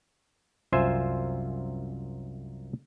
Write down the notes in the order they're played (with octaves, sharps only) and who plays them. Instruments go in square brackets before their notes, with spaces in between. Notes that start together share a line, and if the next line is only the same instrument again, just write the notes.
[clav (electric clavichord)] C2 F#2 F4 C5 E5 G#5